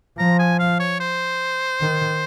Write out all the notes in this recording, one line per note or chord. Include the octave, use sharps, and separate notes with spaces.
F3 A#5
G#5
F5
C#5
C5
D#3